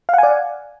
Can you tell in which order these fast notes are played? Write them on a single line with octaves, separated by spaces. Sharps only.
F5 F#5 G#5 D5